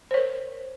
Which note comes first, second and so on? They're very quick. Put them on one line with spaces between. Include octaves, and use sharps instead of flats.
C5 C#5 A#4